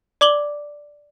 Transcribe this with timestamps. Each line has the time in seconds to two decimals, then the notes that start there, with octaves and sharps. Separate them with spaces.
0.21 D5 D6 F#7 G7